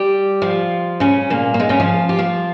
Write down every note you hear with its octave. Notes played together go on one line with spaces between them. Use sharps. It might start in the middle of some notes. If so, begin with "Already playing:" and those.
Already playing: G3 G4
F3 F4
C#3 C#4
A#2 A#3
A#3
G#2 G#3
C#3 C#4
F3 F4
G4
F3 F4